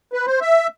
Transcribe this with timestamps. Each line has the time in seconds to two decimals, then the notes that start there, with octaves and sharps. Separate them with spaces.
0.13 B4
0.27 C5
0.41 E5